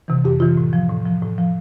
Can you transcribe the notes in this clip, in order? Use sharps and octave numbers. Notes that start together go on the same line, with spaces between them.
C3 E3
F2 G4
C3 E3 F4
A2
F3
A2
F3
A2
F3